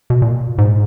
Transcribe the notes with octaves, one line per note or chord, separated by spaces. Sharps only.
B2
A#2
G#2